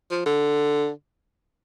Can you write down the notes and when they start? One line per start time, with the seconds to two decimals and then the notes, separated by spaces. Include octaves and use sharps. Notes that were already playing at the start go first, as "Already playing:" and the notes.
0.11 F3
0.26 D3